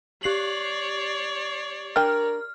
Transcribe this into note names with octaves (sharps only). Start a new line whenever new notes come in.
G4 C#5 D5 C7 F#7
D4 A#4 G5 F6